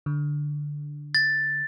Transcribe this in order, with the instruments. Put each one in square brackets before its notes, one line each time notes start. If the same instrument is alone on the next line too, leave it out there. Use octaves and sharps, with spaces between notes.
[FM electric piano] D3
[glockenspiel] A6